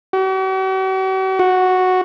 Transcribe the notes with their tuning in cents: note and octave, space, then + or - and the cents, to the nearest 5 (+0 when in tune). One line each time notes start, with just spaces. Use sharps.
F#4 +45
F#4 -5